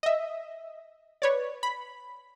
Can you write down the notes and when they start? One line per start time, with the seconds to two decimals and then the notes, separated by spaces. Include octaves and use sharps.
0.03 D#5 E5
1.22 B4 C#5 D5
1.63 B5